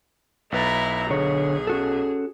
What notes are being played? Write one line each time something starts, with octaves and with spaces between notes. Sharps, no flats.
B1 E4 B4 A#5 A6
D3 G#4 C#5
C#4 F#4 A4